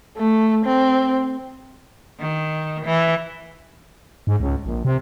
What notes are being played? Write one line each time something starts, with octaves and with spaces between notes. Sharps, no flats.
A3
C4
D#3
E3
G#2
C#2
A#1
C3